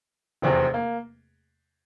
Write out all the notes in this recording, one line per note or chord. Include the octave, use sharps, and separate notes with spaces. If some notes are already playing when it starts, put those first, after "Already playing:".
F1 E2 C3 C4
A#3